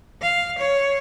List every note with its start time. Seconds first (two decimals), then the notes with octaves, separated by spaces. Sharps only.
0.22 F5
0.59 C#5